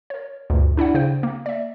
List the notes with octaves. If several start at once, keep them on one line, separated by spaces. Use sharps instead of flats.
A#4 C#5
D2 G2 A#2
D4 E4 D5 F#5
C#3 C5 G5
A#3
D5 E5